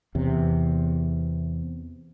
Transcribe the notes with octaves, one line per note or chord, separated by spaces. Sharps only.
E2 C3